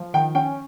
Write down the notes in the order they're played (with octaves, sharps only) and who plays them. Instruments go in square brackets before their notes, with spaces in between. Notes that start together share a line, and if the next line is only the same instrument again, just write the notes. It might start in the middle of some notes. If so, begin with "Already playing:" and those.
Already playing: [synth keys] F3
[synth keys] D#3 [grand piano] G5
[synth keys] C#4 [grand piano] G5